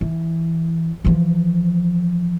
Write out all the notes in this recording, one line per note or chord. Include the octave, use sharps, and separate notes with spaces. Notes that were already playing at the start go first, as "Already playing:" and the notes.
E3
E3 F3